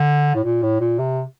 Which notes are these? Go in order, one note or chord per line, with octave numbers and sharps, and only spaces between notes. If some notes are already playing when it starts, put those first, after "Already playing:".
Already playing: D3
A2
A#2
A2
A#2
C3